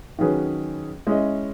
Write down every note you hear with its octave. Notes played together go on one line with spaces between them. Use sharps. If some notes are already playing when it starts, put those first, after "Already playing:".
D#3 F#3 C#4 G#4 B4
G#3 C#4 E4 G#4 D#5